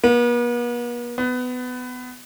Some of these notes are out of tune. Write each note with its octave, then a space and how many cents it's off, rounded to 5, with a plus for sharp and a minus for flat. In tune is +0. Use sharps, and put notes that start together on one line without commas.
B3 -45
B3 +20